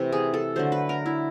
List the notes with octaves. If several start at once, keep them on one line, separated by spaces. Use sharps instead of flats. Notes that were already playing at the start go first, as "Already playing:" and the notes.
Already playing: C3 E3 A3
G#4
A4
D3 F#3 A3 C5
B4
A#4
E4